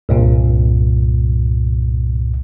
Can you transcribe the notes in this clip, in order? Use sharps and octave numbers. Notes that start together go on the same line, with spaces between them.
C2 G2 A#2